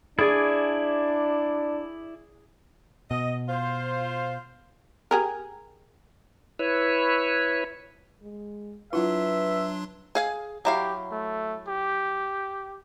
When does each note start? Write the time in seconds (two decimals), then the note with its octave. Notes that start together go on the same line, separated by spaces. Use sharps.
0.19 D4 E4 G#4 D5 G#5
3.11 B2 D#5
3.49 F4 C5
5.11 G4 G#4 A#4
6.59 E4 B4 C#5
8.23 G#3
8.93 F#3 D4 E4 F4 B4 E5 F#5 C6
10.15 G#4 F5 G#5
10.65 F#3 E4 G4 F5
11.11 A3
11.68 G4